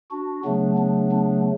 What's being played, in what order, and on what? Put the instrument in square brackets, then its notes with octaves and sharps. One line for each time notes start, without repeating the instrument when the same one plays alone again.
[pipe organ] D4 F#4
C#3 F#3 A3 B3 D4
B3 D4
B3 D4